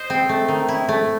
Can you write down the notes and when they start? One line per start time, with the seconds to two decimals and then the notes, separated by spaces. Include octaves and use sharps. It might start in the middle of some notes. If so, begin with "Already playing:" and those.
Already playing: C5 D#5
0.10 C4
0.29 A3
0.48 D#3
0.69 E4
0.89 A3